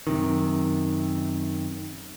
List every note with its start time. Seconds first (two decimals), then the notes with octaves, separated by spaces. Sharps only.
0.07 F#2 C3 D#3